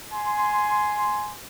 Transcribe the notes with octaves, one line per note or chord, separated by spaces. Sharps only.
G#5 C6